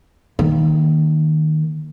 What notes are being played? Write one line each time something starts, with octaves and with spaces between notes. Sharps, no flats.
D#3 A#3